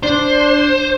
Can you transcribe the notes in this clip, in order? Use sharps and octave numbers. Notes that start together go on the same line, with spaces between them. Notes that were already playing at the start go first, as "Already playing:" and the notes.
D4 C5